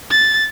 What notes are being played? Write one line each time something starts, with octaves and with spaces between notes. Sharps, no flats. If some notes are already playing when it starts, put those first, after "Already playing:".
A6